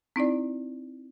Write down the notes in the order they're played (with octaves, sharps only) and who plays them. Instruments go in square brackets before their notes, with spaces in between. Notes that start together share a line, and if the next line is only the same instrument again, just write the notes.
[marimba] C4 D#4 E4 D5